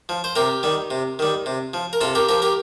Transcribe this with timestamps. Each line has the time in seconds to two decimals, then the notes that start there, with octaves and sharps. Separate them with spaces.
0.09 F3
0.24 C5
0.36 C3 G4 A#4
0.63 D#3 G3
0.91 C3
1.19 D#3 G3
1.46 C3
1.74 F3
1.93 A#4
2.01 C3 F4 A4
2.15 G4 A#4
2.29 F3 G4 A#4
2.42 G4 A#4